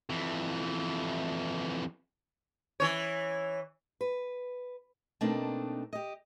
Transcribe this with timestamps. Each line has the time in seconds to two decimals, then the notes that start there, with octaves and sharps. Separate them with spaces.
0.10 F2 E3
2.80 E3 C#5
4.01 B4
5.21 B2 A3 A#3 C4 D4 D#4
5.93 G4 D#5